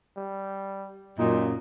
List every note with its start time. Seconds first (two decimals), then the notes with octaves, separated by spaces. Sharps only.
0.18 G3
1.18 F#2 A#2 D#4